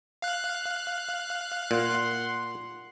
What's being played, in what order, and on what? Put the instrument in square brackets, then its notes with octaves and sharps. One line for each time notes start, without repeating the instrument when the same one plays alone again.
[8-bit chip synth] F5 F#6
[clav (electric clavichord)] A#2 [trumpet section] F#5 C6